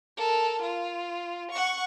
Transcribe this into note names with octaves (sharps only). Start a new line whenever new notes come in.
A4 A#4
F4
F#5 C#6